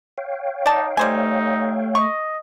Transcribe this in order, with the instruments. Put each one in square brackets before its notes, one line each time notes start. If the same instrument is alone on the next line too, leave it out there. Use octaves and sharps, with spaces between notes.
[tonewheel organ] C#5 F5 G5
[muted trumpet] D#4 [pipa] D5 A5
[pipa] G3 C5 G#5 [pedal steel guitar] A3 [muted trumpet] D#4
[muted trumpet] D#5 [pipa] C#6